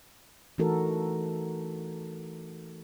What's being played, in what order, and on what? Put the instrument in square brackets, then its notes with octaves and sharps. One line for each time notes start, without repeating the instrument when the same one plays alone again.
[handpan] E3 A3 D#4 F#4 A4 A#4